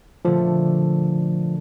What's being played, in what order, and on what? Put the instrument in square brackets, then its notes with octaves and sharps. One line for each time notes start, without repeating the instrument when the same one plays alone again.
[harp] A#2 D3 A3 [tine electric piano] F3